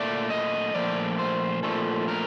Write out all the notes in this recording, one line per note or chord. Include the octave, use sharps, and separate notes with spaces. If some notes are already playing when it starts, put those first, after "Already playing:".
Already playing: A#2 A3 D5
D#5
A#2 F3 A3 D5
C5
A#2 F3 A3 A4
A#4